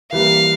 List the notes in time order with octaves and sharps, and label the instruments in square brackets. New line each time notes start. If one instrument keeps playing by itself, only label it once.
[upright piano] E3 G3 A#3 [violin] F5